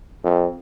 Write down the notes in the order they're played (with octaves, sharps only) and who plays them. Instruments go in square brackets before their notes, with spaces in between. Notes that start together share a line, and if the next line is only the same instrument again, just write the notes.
[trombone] F2